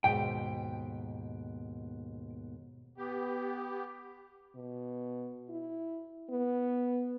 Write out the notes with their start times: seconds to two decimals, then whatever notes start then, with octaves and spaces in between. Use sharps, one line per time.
0.04 D#2 G#2 B2 G5
2.98 B3 G4
4.56 B2
5.49 E4
6.31 B3